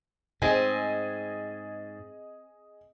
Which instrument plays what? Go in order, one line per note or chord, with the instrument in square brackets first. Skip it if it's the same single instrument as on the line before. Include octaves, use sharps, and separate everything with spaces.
[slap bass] G#2 [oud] C4 [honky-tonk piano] G#4 D#5 G#5